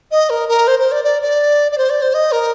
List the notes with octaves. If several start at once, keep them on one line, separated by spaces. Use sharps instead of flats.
D#5
A#4
A#4
C5
C5
D5
D5
D5
D5
C5
D5
C5
D#5
A#4